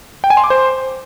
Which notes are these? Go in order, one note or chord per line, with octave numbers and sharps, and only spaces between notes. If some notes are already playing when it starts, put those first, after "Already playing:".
G5
G#5
C6
D6
C5